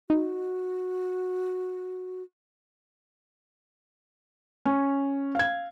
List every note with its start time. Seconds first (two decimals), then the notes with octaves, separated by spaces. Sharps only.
0.10 D#4 F#4
4.65 C#4
5.35 F5 G#6